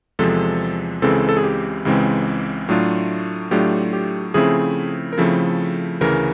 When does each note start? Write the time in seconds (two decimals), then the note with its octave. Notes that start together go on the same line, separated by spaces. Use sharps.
0.19 E2 C3 F3 G#3 A4
1.02 C#2 C#3 E3 G#3 C4 A4
1.29 A4
1.37 G#4
1.43 G4
1.85 C#2 C#3 E3 G#3 C4
2.69 A2 F#3 A3 D4 F4
3.51 A2 F#3 A3 D4 F4 G4
3.93 G4
4.34 C#3 F3 A3 C4 E4 G#4
5.13 A#4
5.18 C#3 F3 A3 C4 E4 A4
6.01 D2 C#3 E3 A#4